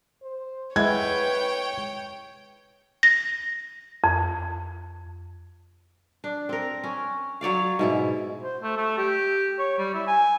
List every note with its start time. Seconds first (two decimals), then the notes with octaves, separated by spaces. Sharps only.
0.23 C5
0.76 G#3 E4 B4 C#5 F#5 G5 G#6
3.03 A#6
4.04 F2
6.24 D4
6.49 C4 A#4
6.84 C#4
7.41 F#3 C#5 D5 F5
7.79 G#2 B2 E4
8.42 C5
8.62 A3
8.77 A3
8.97 G4
9.58 C#5
9.78 G3
9.94 E4
10.07 G#5